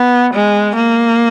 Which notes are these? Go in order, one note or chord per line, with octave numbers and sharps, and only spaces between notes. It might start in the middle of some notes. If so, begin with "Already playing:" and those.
Already playing: B3
G#3
A#3